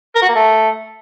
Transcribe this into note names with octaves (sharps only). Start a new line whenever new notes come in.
A#4
F#4
A#3
A3